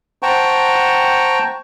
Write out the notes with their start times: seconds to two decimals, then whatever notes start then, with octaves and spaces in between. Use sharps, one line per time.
0.23 C5 F#5 G5 A5 A#5 C#6